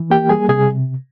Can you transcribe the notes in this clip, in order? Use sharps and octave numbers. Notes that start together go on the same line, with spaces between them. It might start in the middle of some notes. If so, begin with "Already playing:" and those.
Already playing: E3
A#3 G4 G5
G3 G#4 G#5
C3 G#4 G#5